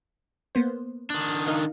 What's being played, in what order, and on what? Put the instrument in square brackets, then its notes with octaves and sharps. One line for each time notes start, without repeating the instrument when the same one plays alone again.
[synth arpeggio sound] A#3 B3 C5
[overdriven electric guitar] D#3 D4
[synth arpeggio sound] D#4 A#4 F5